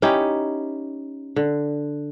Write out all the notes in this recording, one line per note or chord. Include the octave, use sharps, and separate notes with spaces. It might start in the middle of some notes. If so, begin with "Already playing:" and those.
C#4 D#4 E4 G4
D3